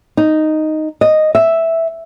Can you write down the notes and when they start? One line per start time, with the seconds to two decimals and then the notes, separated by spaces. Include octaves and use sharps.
0.17 D#4
1.01 D#5
1.35 E5